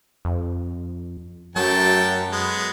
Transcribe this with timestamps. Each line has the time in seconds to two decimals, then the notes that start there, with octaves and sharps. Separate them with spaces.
0.25 F2
1.56 F#2 F#3 A3 G5 A5
2.32 G#3 B3